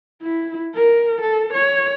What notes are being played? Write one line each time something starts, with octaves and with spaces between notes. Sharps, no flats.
E4
A#4
A4
C#5